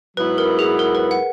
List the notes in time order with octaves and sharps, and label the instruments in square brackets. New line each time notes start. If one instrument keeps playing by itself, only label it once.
[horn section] G#2 F#3 B3 E4 [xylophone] B4
[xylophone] A#4
G#4
A#4
B4
F#5